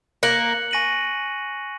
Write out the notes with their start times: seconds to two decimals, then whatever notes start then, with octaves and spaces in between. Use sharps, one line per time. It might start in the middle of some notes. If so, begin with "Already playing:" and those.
0.23 A#3 F#6 C#7 F#7
0.71 G#5 C#6 A#6 D#7 F#7